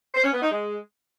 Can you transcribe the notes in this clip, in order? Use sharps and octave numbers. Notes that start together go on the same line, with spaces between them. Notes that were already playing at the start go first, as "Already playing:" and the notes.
C5
C#4
B3
D#4
G#3